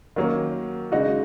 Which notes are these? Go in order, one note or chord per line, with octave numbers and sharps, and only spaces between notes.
D#3 F#3 A#3 C#4
C#3 G#3 D#4 F#4